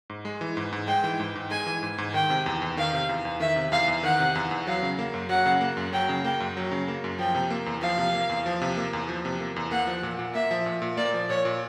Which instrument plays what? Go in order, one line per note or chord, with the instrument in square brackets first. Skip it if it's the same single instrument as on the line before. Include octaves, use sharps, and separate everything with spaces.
[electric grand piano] G#2
G#3
E3
G#2
G#2
[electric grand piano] G#3 [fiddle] G5
[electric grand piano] E3
G#2
G#2
[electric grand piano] G#3 [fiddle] G#5
[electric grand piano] E3
G#2
G#2
[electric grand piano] D#3 [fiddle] G5
[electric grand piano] C3
E2
E2
[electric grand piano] D#3 [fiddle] F5
[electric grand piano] C3
E2
E2
[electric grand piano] D#3 [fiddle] E5
[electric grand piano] C3
[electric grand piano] E2 [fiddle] F5
[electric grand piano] E2
[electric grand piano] D#3 [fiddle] F#5
[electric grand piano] C3
E2
E2
[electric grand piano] F#3 [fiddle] F5
[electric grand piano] C#3
A#3
F#2
[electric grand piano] F#3 [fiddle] F#5
[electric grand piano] C#3
A#3
F#2
[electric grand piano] F#3 [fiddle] G5
[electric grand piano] C#3
[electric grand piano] A#3 [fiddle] G5
[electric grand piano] F#2
F#3
C#3
A#3
F#2
[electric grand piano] F3 [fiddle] G5
[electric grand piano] C3
A#3
E2
[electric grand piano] F3 [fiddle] F5
[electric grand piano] C3
A#3
E2
F3
C3
A#3
E2
F3
C3
A#3
E2
[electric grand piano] A#3 [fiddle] F#5
[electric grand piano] F3
A#2
A#2
[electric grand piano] A#3 [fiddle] E5
[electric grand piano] F3
A#2
A#2
[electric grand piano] A#3 [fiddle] D5
[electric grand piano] F3
[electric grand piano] A#2 [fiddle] C#5
[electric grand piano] A#2